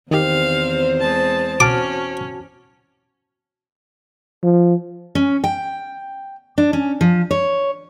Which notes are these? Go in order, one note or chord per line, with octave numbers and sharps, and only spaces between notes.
E2 D#3 C4 G4 C5 F5
G#3 A5
C#4 F#4 A5 D6 F6
F3
C#4
G5
D4
C#4
F3
C#5